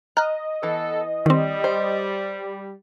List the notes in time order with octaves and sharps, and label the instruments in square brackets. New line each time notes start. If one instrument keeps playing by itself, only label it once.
[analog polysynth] D#5 [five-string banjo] A#5 [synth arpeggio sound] F6 F#6
[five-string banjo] E3 [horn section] B3 A4
[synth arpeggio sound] D#3 C4 [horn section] G3
[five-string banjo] C5